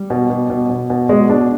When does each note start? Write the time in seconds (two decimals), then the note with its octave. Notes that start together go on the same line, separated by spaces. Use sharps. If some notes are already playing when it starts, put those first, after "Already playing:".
Already playing: G3
0.10 B2
0.30 B2
0.50 B2
0.70 B2
0.90 B2
1.09 B2 G#3
1.29 B2 D4